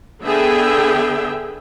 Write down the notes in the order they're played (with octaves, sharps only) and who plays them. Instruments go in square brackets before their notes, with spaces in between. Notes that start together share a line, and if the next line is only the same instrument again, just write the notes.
[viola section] D3 B3 G#4 E5 G5